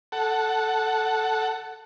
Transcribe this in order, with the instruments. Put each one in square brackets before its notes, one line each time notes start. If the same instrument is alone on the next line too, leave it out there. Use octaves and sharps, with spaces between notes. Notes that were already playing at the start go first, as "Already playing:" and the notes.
[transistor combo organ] A4 F#5